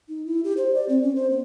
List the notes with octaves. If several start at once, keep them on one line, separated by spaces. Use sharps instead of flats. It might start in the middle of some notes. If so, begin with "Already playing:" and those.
D#4
E4
G4
C5
D5
C4
C#4
C5
B3